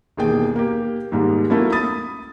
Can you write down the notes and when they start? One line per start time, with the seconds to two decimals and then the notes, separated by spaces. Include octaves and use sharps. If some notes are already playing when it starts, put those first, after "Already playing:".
0.17 E1 D#2 G#4 G5
0.56 A#3 G4
1.12 D#2 G#2 G3 G#3
1.50 F#3 A3 A#3 C#4 E4
1.72 B5 D#6 A6